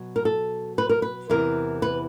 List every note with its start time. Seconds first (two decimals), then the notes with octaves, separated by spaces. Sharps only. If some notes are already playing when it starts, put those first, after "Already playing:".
Already playing: B2 F#3
0.16 A#4
0.25 A4
0.78 B4
0.89 A#4
1.02 B4
1.29 E2 C3 E3 A#4
1.82 B4